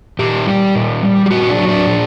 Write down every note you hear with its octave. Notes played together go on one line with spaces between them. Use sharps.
A#2 G4
G3
A#2
G3
G4
A#2 F#4
D4
F#3
D4
A#2